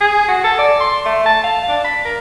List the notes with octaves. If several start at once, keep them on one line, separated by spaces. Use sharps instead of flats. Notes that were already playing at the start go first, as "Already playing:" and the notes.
G#4
F#4
A4
D5
C6
A3
A5
F5
D4
B5
A#4